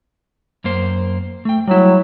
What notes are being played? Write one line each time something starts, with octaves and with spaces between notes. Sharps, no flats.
F#2 A#3 C5
A3 G5
F#3 G3 E4